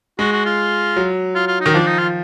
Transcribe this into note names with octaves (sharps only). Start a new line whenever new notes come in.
G#3 F#4
F#4
F4
F#3
F4
F4
D#4
D#3
F3 D4
D#4
F4